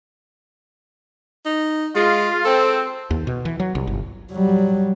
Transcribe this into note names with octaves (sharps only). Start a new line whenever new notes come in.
D#4
G#3 F4
C4 A4
D#2
B2
E3
F#3
C2
G1
F#3 G3